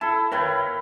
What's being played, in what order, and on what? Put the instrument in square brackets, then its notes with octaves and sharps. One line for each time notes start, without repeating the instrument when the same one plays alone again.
[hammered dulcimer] E4 [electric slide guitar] A4 A5
[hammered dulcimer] E4 B4 F5 [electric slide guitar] A#4 C#5 G5